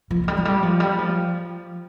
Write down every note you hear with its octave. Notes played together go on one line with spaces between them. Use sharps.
F3
F3
G3
F3
G3
F3
G3
F3